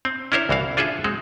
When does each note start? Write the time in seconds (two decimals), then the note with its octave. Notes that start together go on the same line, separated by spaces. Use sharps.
0.05 C4
0.32 C#4 D4 E4 A#4 C5 C#5
0.49 C2 E3 F#4 F5
0.77 D4 F4 G#4 A4 D5 E5
1.04 G#3 C4 F#4